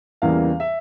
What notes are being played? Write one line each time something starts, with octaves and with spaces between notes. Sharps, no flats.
E2 C#3 E3 G3 A#3 F5
E5